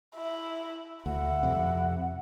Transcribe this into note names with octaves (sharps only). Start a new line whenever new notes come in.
E4
D2 E4 F#5
F2 C3